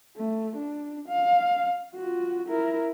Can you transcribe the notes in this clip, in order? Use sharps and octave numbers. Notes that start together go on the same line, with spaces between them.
A3
D4
F5
F4 F#4
E4 A#4